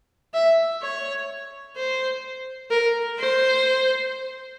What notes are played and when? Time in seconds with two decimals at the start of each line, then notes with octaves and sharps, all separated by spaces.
0.34 E5
0.82 C#5
1.76 C5
2.71 A#4
3.19 C5